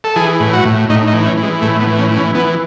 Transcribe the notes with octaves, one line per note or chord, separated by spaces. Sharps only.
A4
E3 G#4
A2
F#4
A2
A2 D#4
D#4
E3
C#4
E3
G#3
A2 A3
B3
E3
C#4
E3
C#4
E3 B3